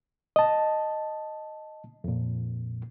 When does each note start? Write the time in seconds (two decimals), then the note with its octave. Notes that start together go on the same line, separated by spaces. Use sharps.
0.36 D#5 A5
2.04 F2 A#2